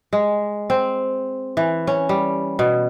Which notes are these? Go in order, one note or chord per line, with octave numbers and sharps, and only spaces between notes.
G#3
C4
E3
C#4
G3
B2